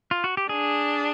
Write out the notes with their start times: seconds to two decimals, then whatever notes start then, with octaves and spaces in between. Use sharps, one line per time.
0.11 F4
0.24 F#4
0.37 G4
0.49 D4 G#4